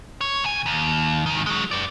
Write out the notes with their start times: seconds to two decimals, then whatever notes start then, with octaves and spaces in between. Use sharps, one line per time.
0.21 C#5
0.44 C3 G#5
0.66 D#2
1.26 G#2 D#3
1.46 F#3 G#3
1.71 B4 D5